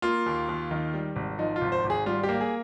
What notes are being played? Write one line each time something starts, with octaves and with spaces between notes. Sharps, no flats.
A#3 F4
D#2
D#2
D#3
G3
G#1
F3 D#4
F4
G#1
C5
G#1
G#4
G3 F4
G4
A#3
G#4